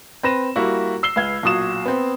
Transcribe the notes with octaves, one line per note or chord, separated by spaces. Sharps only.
C4 B4 A#6 E7
G3 A#3 E4 F#4
E6 C7 G7
C#2 B4 F5 G#6
B1 A#2 F#4 D#6 E7
B3 C4